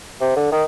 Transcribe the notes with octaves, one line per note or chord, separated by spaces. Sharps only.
C3
D3
D#3